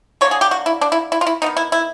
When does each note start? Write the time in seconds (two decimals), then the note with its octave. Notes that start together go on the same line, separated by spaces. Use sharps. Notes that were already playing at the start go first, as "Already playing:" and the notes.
0.21 D3 F#3 A#3 C#5
0.31 G#4
0.41 G4
0.51 F#4
0.66 E4
0.81 D4
0.92 E4
1.12 E4
1.21 F4
1.27 E4
1.42 D#3 G3 B3 D#4
1.57 E4
1.72 E4